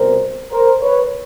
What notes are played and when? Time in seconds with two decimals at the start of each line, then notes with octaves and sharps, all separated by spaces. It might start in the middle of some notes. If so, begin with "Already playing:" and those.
Already playing: C2 B2 G3 C4 A#4 C5
0.52 A#4 C5
0.81 B4 C#5